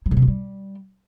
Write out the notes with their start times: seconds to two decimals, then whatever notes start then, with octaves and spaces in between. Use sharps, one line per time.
0.06 F#3
0.11 D3
0.17 C3
0.22 F3
0.28 G3